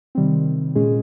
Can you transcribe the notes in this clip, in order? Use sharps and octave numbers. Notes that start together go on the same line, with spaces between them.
C3 D#3 G3 C4
A#2 G#3 C#4 G#4